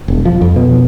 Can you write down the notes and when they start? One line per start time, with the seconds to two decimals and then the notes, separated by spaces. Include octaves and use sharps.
0.08 E1
0.25 F3
0.41 F2
0.56 B2